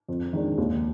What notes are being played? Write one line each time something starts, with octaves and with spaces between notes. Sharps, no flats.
F2
D#3 G#3 D4
D#2